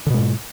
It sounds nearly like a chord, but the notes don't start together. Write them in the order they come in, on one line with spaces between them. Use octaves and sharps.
D3 B2 G#3 G#2